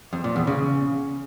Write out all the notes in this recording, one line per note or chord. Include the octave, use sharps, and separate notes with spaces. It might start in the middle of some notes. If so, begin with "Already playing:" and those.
F2
A#2
E2
C#3